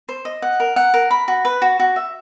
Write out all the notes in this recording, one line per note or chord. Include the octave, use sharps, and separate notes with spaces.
C5
D#5
F#5
A#4
F#5
A#4
B5
F#4
B4
F#4
F#4
E5